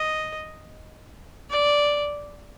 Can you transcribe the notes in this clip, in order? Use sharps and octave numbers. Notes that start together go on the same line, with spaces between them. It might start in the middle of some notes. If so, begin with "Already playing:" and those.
Already playing: D#5
D5